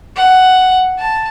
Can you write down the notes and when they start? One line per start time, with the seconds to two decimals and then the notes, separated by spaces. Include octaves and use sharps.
0.16 F#5
0.99 A5